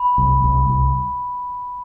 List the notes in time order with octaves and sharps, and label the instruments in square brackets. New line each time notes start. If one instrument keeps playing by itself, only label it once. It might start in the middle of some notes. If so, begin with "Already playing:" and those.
Already playing: [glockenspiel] B5
[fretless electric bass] C2
C2
C2